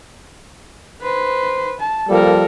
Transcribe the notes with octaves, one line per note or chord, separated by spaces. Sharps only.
B4 C5
A5
F3 G3 A#3 A4 A#4